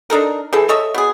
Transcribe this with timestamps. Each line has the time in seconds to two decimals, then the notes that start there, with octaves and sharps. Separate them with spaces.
0.10 D4 D#4 A4 A#4
0.53 E3 G#4 A4
0.69 A4 C#5 D#5 E5
0.94 B2 G#4